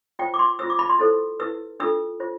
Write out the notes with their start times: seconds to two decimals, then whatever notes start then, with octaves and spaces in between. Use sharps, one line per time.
0.19 F4 C5 G5
0.34 D6
0.39 C6
0.59 F4 C5 E6
0.70 D6
0.79 B5
0.89 C6
0.99 E4 A4 C5
1.40 E4 B4 E6
1.80 D4 F4 A4 E6
2.20 F4 C5